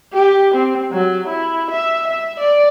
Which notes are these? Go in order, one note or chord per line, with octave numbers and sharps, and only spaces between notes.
G4
C4
F#3
E4
E5
E5
D5